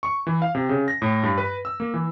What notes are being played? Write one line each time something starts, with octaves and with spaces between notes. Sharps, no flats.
C#6
E3
F5
C3
C#3
A#6
A2
G2
B4
E6
A#3
E3